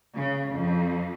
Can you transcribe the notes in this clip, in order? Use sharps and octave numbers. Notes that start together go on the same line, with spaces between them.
C#3
F2